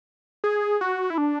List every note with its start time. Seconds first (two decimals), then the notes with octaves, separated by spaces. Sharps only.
0.44 G#4
0.81 F#4
1.10 E4
1.18 D4